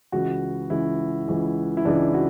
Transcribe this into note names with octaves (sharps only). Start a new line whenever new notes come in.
C#2 C#3 E3 F#4
C#2 C#3 E3 E4
C#2 C#3 E3
E4
C#2 C#3 E3 D4
F#4